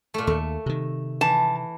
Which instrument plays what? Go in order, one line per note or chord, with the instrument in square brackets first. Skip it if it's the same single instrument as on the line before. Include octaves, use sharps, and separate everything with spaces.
[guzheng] A#2 A3
[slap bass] D#2 [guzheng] A3
[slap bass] C3 D#3
[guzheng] E3 [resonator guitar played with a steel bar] A5